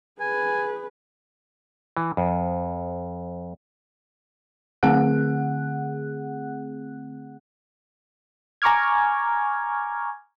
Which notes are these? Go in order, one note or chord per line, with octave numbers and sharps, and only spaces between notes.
G#4 B4 G#5
E3
F2
D3 A3 C4 G#4 F#5 F#6
G#5 A#5 C#6 D6 F6 G#6